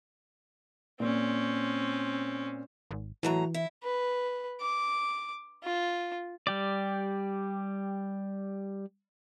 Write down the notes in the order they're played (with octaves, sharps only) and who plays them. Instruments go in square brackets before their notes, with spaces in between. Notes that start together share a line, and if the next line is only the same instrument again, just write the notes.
[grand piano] A#2 [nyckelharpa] C4 C#4
[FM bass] G#1
[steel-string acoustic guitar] A2 F#3 A#5 [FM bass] E3
[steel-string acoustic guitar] E4
[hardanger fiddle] B4
D6
F4
[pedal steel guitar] G3 G4 D5